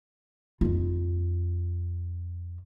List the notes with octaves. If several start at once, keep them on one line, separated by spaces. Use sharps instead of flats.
F2 F4